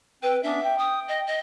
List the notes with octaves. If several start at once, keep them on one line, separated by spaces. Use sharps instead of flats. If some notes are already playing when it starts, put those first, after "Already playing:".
C4 B4 G5
B3 C#4 D4 E5
G5
D#6
D#5
D#5